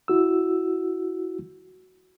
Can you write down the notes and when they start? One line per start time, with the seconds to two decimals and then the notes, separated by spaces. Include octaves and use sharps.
0.08 E4 F#4 E6